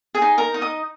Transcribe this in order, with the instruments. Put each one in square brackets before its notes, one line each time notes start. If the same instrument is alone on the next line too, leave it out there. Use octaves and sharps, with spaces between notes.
[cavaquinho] G#4 G#5
D#4
A#4 A#5
D#4
D#5 D#6